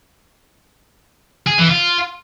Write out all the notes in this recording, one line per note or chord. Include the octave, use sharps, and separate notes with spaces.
G#4
E3
F4